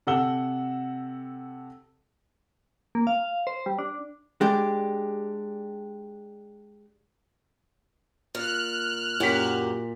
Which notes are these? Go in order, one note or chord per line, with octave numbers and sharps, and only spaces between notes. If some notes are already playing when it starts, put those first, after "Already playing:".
C3 A4 F#5 E6 G7
A#3
F5
C5
G3
D4
G#3 D4 G4
A#2 F6 F#6
F#2 A#2 F#4 G4 B6